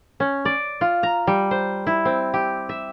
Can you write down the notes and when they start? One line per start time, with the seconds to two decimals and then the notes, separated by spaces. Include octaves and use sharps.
0.20 C#4
0.45 D5
0.81 F4
1.03 A#5
1.27 G3
1.51 C5
1.87 E4
2.05 C4
2.34 G4
2.69 E5